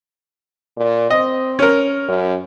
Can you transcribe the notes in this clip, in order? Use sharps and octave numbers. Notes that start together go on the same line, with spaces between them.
A#2
C4 D#5
C#4 A#4
F#2